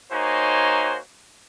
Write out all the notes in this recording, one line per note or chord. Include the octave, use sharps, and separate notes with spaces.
A#3 D#4 F#4 C5 C#5 G#5